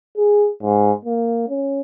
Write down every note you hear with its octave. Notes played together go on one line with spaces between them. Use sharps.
G#4
G#2
A#3
C#4